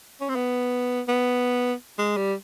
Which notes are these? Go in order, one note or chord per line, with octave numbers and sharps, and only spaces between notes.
C#4
C4
B3
B3
G#3
G3